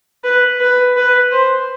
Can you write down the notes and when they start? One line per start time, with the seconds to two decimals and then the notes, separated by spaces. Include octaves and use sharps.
0.24 B4
0.60 B4
0.96 B4
1.31 C5